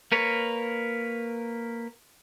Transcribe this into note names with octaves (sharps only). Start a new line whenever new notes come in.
A#3 A#4 B4 C#5